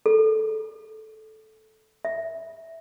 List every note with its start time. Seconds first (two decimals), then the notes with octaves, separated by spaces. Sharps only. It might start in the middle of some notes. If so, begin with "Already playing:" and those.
0.06 A4
2.05 E5